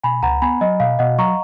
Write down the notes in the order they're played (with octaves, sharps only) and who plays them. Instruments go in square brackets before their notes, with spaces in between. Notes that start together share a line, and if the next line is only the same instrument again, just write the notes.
[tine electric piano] B2 [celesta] G#5 B5
[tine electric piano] C#2 [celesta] F#5 A#5
[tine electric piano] B3 [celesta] G#5 B5
[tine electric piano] F#3 [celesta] D#5
[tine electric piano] B2 [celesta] F5
[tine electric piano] B2 [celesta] D#5 F#5
[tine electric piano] F#3 [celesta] A#5 C#6